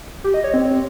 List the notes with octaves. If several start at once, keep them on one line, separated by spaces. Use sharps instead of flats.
G4
D#5
C#5
C4